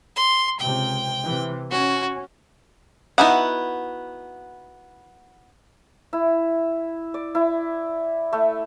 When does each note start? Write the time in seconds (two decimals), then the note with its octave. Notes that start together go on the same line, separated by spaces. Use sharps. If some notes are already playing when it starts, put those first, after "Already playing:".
0.16 C6
0.60 C#2 C3 G5
1.23 C3 E3
1.71 C#4 F#4
3.18 B3 D#4 E4 F#4 F#5
6.13 E4
7.14 D5
7.35 E4
8.33 A3